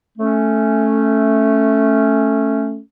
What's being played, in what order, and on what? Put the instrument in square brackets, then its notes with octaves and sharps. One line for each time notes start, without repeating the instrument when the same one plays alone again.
[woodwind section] A3 C#4